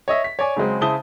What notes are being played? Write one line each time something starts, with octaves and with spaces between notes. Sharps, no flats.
C#5 D#5 E5
B6
C#5 D5 G#5
C#3 F#3 G#3 C4
C#3 E4 C5 A5 D#6 G7